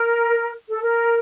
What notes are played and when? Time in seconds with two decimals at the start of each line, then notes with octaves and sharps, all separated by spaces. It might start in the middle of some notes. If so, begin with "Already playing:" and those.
Already playing: A#4
0.70 A4
0.82 A#4